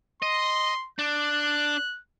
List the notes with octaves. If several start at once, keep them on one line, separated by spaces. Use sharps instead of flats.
D#5 C6
D4 F#6